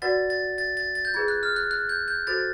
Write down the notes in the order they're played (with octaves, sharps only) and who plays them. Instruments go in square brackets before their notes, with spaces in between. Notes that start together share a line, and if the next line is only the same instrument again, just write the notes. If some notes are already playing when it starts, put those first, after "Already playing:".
[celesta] F#4 B4 D5 F#5 [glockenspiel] A6
[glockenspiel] A6
A6
A6
A6
G6
[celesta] F4 G#4 B4 [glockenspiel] G#6
[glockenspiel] F#6
F6
F#6
F#6
G6
G6
[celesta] F#4 A4 C5 [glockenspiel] A6